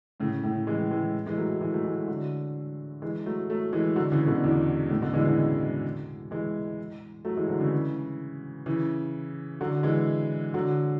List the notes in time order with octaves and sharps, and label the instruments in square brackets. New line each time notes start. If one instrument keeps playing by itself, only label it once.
[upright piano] A2 C#3
A2 C#3
E3 G#3
E3 G#3
E3 G#3
F#3 A3
E3 G#3
F#3 A3
E3 G#3
D3 F#3
E3 G#3
F#3 A3
F#3 A3
E3 G#3
D3 F#3
C#3 E3
B2 D3
E2
A2 C#3
B2 D3
E3 G#3
C#3 E3
E3 G#3
F#3 A3
E3 G#3
D3 F#3
C#3 E3
C#3 E3
D3 F#3
E3 G#3
D3 F#3